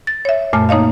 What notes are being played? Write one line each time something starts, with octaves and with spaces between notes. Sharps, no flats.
A6
C#5 E5
F#2 A#2 A3 G#5 F6
A#3 D#4 C#5 D#5 F5